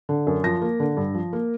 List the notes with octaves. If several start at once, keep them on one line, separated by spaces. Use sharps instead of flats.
D3
F#2
F3 A#6
A#3
D3
G2
F3
A#3